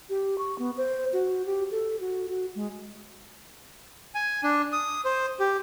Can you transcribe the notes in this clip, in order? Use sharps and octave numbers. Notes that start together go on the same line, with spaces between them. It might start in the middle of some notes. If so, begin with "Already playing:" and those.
G4
C#6
B3
C5
F#4
G4
A4
F#4
F#4
G#3
G#5
D4
D#6
C5
G4